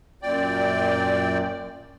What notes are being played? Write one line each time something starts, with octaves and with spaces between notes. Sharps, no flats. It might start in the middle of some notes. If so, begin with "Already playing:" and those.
F#2 A#2 D5 G5